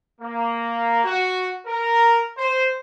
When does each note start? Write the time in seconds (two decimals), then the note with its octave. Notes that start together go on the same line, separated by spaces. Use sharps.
0.21 A#3
1.04 F#4
1.66 A#4
2.38 C5